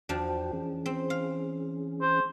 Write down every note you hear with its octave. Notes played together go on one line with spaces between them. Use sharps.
E2 F3 D4 F#4 G5
E3 C#4 G#4
C4
F5
C5